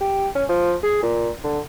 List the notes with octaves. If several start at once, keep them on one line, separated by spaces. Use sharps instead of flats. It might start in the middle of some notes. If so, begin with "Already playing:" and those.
G4
C#4
F3
G#4
A#2
D3